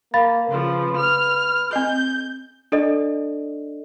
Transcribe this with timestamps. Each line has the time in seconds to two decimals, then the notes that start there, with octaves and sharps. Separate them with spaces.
0.14 A#3 F5 B5 A6
0.48 C#3 F3 B4
0.97 F6
1.73 C4 D#5 G6
2.72 D4 A4 D5 D#5